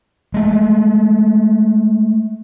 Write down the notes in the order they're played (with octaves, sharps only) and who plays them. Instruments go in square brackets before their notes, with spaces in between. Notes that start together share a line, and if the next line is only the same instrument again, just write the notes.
[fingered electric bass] G#3 A3